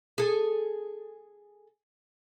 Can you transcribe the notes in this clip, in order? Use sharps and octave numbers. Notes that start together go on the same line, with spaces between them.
G#4 A4